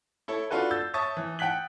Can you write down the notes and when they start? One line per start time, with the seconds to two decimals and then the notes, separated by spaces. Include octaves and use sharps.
0.28 E4 A4 C#5
0.51 D4 F4 F#4 A4 B4
0.71 E6 G6 A6
0.94 C#5 E5 A5 C#6 D#6 A6
1.17 E3
1.39 F#5 G5 F#6 B6 F#7